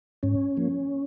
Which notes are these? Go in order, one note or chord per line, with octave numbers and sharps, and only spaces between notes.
G#2 C#4
F3 A#3